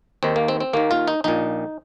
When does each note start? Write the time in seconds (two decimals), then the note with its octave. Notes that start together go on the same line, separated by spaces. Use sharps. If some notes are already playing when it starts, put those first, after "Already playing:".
0.23 D#2 D#3 C4
0.36 A#3
0.48 C4
0.60 C4
0.73 D#2 D#3 A#3
0.91 F4
1.08 D#4
1.24 A#1 A#2 D#4